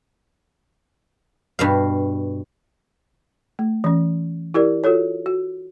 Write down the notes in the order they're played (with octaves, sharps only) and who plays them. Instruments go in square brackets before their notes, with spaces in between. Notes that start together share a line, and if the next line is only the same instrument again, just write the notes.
[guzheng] G2 B2 F5
[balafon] A3
E3 C#4
E4 G4 A#4 D5
F4 F#4 A4 C#5
F#4